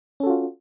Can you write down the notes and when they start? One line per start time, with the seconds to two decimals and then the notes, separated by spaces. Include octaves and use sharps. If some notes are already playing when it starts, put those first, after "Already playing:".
0.20 C#4
0.23 A4
0.27 F#4
0.30 F4